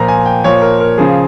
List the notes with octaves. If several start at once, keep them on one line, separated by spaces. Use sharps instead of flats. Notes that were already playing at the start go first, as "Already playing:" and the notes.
Already playing: A#2 F3 A#5
G#5
G5
A#2 F3 C#5
A#4
A#4
C#3 F3 G#4